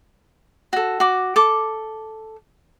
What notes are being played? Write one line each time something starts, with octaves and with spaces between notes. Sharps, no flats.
F#4 A4
F#4 D6
A4 D6